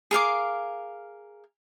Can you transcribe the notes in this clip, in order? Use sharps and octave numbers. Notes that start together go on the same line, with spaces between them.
G#4 A#4 F5 D6